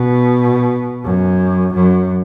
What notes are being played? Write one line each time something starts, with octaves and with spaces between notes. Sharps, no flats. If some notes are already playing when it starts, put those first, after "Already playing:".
Already playing: B2
F#2
F#2